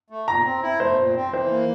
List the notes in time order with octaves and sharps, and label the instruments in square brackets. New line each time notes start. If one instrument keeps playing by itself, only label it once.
[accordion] A3
[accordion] A#2 [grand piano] A#5
[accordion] C4
E4
[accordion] A3 [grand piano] C5
[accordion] A#2
C4
[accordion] E3 [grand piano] C5
[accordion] A#3